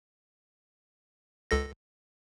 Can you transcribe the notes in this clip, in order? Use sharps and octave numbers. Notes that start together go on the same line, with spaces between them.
C#2 A4 A#6